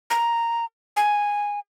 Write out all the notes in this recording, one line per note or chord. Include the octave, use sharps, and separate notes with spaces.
A#5
G#5